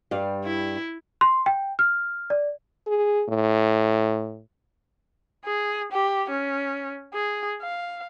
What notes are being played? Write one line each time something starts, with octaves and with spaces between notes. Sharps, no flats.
G2 G3 F5
E4
C6
G5
F6
D5
G#4
A2
G#4
G4
C#4
G#4
F5